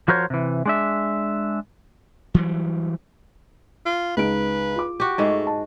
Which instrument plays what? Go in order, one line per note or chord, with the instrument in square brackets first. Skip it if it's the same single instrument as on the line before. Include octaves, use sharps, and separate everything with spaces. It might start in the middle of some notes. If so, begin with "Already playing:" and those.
[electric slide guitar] F3 F#4 A#4 C5 C#5
C3 E3
G#3 D4 E5
[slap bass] E3 F#3 G3
[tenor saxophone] F4
[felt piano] C#2 D#4 D7 [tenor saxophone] B4
[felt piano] F4 D6
[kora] F#4 G4
[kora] G#2 G#3 [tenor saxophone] A3
[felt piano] A5